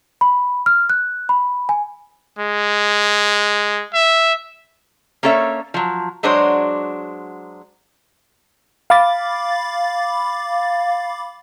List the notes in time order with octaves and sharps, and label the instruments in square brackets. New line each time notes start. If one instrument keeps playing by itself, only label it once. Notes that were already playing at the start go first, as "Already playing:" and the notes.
[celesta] B5
F6
F#6
B5
G#5
[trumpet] G#3
E5
[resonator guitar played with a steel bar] A#3 C#4 A4 C#5 E5
F3 F#3
F#3 G#3 D4 F#4 C5 C#5
[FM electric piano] F5 B5 D6 A6